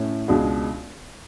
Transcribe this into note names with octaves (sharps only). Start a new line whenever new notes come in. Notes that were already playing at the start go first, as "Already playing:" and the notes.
Already playing: A2 C#4
C#2 B2 G#3 D4 F#4